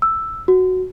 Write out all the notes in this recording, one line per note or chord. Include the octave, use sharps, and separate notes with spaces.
E6
F#4